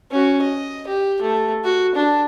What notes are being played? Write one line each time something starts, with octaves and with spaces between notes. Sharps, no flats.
C#4 F#4
D#5
G4
A3
F#4
D4